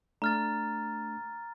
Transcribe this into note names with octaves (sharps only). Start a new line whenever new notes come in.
A3 D4 A#5 F6 A6